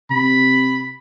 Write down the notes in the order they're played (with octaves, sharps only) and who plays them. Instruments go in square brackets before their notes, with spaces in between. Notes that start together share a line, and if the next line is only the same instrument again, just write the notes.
[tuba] C3 [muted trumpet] B5